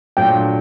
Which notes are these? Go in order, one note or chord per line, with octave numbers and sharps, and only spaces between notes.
A#2 F#3 A3 D4 F4 G5